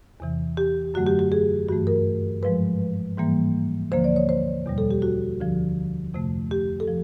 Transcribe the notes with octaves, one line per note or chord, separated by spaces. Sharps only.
E2 C3 E3
G4
F#2 D3 F#3 A3 F#4
G4
G4
G#4
G2 E3 A3 F#4
A#4
G#2 F3 G#3 B4
G#2 E3 G3 A#3
D2 D3 F3 A#3 C5
D5
C#5
C5
E2 B2 G3
A4
G4
F#4
D2 D3 F3
F2 C3 F3 A3
G4
A4
F3